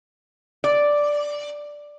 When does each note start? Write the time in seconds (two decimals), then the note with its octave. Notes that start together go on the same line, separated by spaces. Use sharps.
0.64 D5